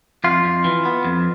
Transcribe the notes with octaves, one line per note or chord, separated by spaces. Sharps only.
F2 F4
F2
E3
B3
F2